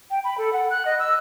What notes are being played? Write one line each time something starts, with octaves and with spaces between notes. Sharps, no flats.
G5
B5
A4
F#5
F#6
D#5
E6